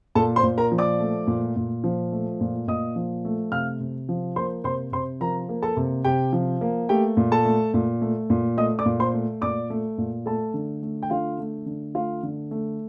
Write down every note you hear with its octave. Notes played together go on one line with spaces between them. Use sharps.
A#2 A4 A5
C5 C6
A#2
A#4 A#5
F3
D5 D6
A3
A#2
A#2
F3
A3
A#2
A#2 D#5 D#6
F3
A3
C3 F5 F6
C3
F3
A#3 C5 C6
C3 C5 C6
C3 C5 C6
F3 A#4 A#5
A#3
A4 A5
C3
C3 G4 G5
F3
A#3
A3 G4 G5
A#2
A4 A5
A3
A#2
A3
A#2
A3 D#5 D#6
D5 D6
A#2
C5 C6
A3
A#2 D5 D6
A3
A#2
A3 A4 A5
D3
A3
G5
D3 F4 F5
A3
D3
A3 F4 F5
D3
A3